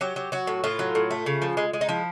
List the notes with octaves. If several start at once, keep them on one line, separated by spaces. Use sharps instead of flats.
F#3 G4
F#3
F#3 F#4
A2
A2 F4
F#3
A2
A3
C#3
F3
G#3
G#3
D#4
F3 E4